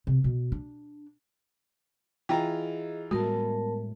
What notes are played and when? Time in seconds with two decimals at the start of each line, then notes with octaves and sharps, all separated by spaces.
0.07 C3
0.24 B2
0.52 D4
2.29 E3 F4 G#4 D#5 G5 A#5
3.11 A2 G3 G#3 B3 F#4 A#4 A5